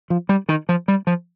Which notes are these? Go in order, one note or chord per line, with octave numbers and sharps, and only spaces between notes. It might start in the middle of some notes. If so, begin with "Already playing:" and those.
F3
G3
D#3
F3
G3
F3